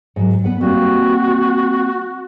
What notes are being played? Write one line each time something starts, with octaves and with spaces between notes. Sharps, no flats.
G#2 F#3
B3 B4 F#5
G3 A#3 C4 F#4